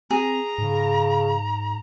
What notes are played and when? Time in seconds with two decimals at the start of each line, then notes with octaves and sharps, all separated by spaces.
0.11 C4 G#4 A#5
0.58 G#2 C#3